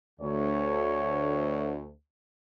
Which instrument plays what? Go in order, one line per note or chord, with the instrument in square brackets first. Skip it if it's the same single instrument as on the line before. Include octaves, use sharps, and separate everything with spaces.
[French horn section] D2 [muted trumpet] C#5